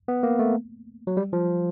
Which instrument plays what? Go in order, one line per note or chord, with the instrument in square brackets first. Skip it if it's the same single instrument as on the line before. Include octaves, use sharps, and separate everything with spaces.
[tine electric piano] B3
A#3
A3
F#3
G3
F3